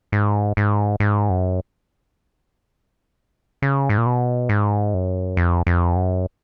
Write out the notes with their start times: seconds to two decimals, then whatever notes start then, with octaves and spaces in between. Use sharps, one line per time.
0.12 G#2
0.57 G#2
1.00 G#2
1.30 F#2
3.62 C#3
3.89 G#2
3.98 A#2
4.06 B2
4.49 G#2
4.94 F#2
5.37 F2
5.67 F2
5.96 F#2